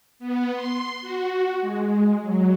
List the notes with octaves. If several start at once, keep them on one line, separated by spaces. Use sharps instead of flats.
B3
C6
F#4
G#3
F#3